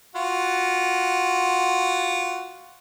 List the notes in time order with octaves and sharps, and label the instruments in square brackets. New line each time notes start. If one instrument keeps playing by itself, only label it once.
[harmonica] F4 F#4